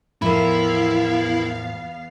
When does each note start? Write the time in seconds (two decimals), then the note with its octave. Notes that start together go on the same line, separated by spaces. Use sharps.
0.22 E2 A2 F3 B3 E4 A#4 F5 B5